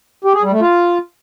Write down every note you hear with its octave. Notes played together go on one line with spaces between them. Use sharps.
G4
G#4
G3
A3
F4